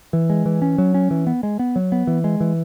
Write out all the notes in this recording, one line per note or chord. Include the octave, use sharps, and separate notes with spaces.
E3
G#3
E3
C#4
F#3
C#4
E3
B3
G#3
B3
F#3
B3
E3
G#3
E3